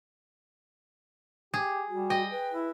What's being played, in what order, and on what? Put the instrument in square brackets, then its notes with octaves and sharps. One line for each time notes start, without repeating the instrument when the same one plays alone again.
[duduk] G4 [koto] G#4
[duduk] G3 [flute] F#4
[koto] D#5 [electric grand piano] G5
[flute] B4
[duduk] E4